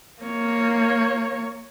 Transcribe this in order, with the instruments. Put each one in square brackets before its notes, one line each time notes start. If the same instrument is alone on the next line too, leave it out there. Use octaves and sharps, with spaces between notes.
[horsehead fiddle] A#3 C#5